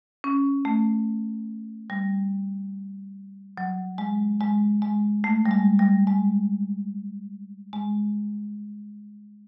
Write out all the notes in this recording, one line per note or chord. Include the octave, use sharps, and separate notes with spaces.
C#4
A3
G3
F#3
G#3
G#3
G#3
A3
G3
G#3
G3
G#3
G#3